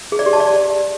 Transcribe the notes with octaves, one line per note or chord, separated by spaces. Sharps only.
G#4
D5
G4
A5
D5